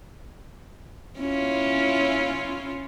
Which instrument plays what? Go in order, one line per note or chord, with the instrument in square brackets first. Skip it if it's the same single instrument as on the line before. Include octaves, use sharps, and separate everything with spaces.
[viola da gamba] C#4 E4 F4